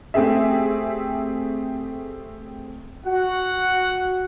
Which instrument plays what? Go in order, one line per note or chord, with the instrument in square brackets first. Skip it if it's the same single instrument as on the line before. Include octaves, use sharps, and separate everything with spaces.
[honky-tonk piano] A3 C4 G4 G#4 E5
[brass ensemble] F#4 F#5